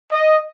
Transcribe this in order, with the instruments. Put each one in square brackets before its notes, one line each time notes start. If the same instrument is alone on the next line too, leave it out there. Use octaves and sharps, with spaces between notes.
[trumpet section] D#5